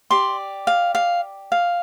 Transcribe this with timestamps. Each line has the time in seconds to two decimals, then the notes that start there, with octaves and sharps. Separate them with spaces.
0.10 G4 D5 C6
0.67 F5
0.95 F5
1.52 F5